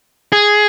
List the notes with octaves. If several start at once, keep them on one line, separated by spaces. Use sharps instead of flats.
G#4